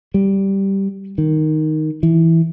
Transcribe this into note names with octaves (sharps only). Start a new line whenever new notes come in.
G3
D#3
E3